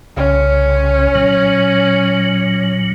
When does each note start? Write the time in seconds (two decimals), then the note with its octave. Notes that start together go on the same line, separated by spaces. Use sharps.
0.17 C2 C#3 C#4
1.15 A#2 F#3